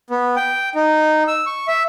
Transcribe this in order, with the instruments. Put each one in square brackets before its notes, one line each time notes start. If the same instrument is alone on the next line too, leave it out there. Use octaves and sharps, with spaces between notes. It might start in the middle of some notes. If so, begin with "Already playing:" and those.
[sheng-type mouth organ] B3
G5
D#4
E6
C#6
E5